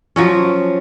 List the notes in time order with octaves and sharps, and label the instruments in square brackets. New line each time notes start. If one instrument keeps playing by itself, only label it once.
[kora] F3 F#3 C#4